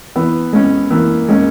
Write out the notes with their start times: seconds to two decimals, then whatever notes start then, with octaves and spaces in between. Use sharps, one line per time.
0.16 E3 B3
0.53 G#3 C#4
0.91 E3 A#3
1.28 G#3 C#4